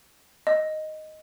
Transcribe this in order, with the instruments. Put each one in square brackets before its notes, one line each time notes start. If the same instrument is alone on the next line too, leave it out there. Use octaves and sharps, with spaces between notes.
[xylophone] D#5